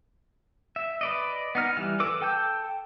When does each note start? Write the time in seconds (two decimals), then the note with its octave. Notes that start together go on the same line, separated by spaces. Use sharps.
0.76 E5
1.01 B4 D5 D#5
1.55 B3 D#4 F6
1.77 E3 G3 F6
2.00 A4 B4 D6 E6
2.21 A4 G5 A5 E6 G6